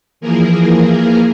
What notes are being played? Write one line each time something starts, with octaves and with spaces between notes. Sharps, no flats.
E3 F3 A#3 G#4 A#4